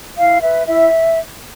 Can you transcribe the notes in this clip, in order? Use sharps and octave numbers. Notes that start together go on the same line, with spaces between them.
E4 F5
B4 E5
E4 E5